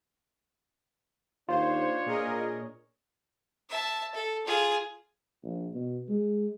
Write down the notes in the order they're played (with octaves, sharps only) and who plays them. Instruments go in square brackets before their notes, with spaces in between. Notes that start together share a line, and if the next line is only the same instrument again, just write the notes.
[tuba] D#2 [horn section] D4 C#5 [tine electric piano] F4 [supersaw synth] C5
[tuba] A#2 [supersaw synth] G#4 A#4 D#5
[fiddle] E5 A5
A4
F4 G#4
[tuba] A#1
B2
G#3